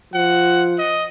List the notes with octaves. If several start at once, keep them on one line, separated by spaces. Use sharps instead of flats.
F3 F#5
D#5